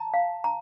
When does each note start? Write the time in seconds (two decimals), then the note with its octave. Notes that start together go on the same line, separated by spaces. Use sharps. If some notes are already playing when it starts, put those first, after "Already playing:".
Already playing: A5 A#5
0.14 F5
0.44 A#5